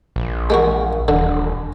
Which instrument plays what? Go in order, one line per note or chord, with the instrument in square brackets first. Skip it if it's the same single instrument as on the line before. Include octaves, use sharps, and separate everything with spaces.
[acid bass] A#1
[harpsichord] G#3 A#3 F#4
[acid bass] D#1 [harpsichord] D3